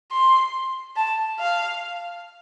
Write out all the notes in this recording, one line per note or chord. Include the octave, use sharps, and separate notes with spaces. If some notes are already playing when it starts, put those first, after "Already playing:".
C6
A5
F5